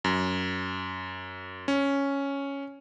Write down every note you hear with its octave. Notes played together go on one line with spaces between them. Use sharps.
F#2
C#4